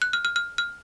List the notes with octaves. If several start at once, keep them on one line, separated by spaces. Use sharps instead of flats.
F#6
F6
F6
F6
F6